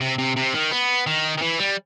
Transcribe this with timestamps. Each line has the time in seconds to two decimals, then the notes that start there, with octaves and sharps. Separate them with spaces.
0.01 C3
0.18 C3
0.36 C3
0.54 D#3
0.71 B3
1.07 D#3
1.38 D#3
1.42 E3
1.59 G3